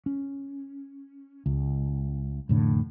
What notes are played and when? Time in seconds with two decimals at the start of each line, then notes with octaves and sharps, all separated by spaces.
0.06 C#4
1.46 C#2
2.49 F1 A2 D3